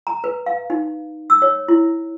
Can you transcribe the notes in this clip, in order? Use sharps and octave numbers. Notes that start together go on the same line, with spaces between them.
A#5
B4
F5
D#4
E6
C#5
E4